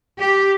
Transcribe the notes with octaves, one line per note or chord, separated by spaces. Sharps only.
G4